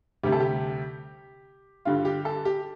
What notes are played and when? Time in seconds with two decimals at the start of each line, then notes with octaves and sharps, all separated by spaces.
0.23 D2 C3 G3 G4
0.32 A4
0.40 G4
1.85 G2 D3 G3 F4
2.05 G4
2.25 A4
2.45 G4